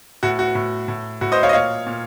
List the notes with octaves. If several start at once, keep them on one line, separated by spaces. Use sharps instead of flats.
A2 F#4
F#4
A2
A2
A2 F#4
C5 D#5
C#5 F5
D#5
A#2 C#5 F5
A#2